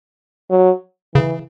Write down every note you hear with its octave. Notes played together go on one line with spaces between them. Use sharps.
F#3
C#3 E3